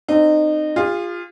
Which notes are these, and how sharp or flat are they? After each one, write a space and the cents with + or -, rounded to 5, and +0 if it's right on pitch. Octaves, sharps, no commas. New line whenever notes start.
C4 +0 D#4 -25
F4 +0 G#4 -45